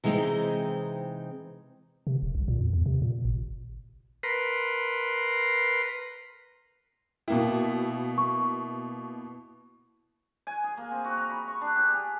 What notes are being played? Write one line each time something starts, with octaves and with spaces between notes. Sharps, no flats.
C3 E3 G#3 B3 C4 D#4
C3
E1
C2
A#2
E2
E2
C3
A#2
G#1
A#4 B4 C6
B2 A#3 E4 G5
C#6
G#5
G#4
A#3
C4
F#4
A#4
B5
C#6
D4
G4
G#4